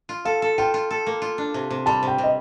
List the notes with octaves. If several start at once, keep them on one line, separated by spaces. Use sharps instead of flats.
F4
A4 F5
A4
F4 G5
F4
A4
A#3
F4
D4
C3
C3
G3 A5
C3 G5
C3
D#5